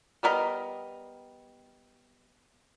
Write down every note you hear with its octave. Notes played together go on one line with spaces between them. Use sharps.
G3 B3 A#4 D#5